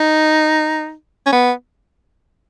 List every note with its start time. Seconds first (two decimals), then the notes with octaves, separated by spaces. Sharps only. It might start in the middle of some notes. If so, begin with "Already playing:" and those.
Already playing: D#4
1.26 C#4
1.33 B3